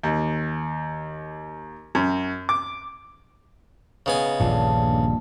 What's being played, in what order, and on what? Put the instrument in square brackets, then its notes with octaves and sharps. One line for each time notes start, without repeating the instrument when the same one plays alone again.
[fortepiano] D#2
F#2
D6
[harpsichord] C#3 B3 G#5 [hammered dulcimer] D#4
[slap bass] D#1 A#1 G2 [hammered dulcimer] A#2 D3 A5